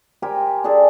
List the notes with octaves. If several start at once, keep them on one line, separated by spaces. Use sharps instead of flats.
G4 A#4 C5 G#5
D4 G#4 A4